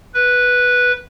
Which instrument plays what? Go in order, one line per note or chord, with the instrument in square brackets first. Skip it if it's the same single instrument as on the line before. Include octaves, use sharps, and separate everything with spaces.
[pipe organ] B4